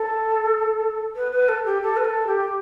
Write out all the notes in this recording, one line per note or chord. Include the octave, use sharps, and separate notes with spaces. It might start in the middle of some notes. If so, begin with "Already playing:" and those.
Already playing: A4
B4
B4
A4
G4
A4
B4
A4
G4